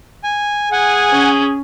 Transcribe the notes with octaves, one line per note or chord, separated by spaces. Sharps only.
G#5
G#4 F#5 G#5
C#4